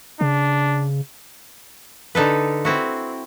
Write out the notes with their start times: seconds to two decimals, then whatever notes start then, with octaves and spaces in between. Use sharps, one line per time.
0.21 C#3 D4
2.15 D3 D#4 A4 B4
2.65 C4 E4 F#4